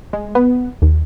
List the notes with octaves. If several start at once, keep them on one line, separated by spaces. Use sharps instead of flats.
G#3
B3
D#2